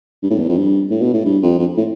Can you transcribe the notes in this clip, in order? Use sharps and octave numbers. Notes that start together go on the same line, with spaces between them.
G2
A2
E2
F2
G2
A2
B2
A2
G2
F2
F2
A2